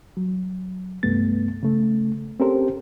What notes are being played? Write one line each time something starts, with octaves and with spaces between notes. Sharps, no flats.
F#3
C2 G2 A3 B3 A6
C#3 A3
C4 C#4 G4 A4 A#4 C5